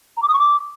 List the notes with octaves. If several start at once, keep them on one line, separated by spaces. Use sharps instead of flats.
A#5
D6
D#6
C#6
D6